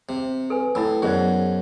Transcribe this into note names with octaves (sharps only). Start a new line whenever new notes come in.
C3
A4 B4 G#5
A2 E4 B5 E6
F#2 B2 G#4 C5 D5